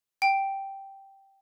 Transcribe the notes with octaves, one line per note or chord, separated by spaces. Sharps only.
G5